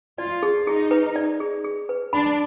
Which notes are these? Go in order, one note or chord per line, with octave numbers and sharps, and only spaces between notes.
F4 D5
G#4
D#4 G#4
B4
D5
G#4
G#4
B4
D4 B5